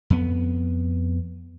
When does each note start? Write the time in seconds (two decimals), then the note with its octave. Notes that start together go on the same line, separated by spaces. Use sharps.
0.10 F2 B3